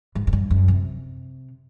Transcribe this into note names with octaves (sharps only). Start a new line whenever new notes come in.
G#2
G#2
G2
F#2
C3